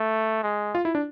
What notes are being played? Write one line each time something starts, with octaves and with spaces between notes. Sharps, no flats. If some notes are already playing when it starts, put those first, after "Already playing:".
Already playing: A3
G#3
F4
E4
D4